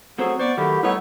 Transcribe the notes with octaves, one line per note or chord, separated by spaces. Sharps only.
F#3 A3 C4 G#4 C5 F#5
B3 C5 D5 C#6
D#3 F#3 A3 E4 G4 A#4
G3 A3 B3 D#4 E4 B4 C#5